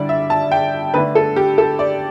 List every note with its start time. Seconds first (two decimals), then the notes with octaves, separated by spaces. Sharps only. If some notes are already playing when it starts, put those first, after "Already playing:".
Already playing: D3 G3 E4 D5
0.09 E5
0.30 A5
0.52 G5
0.94 D3 A3 D4 B4
1.15 A4
1.36 G4
1.58 A4
1.79 D5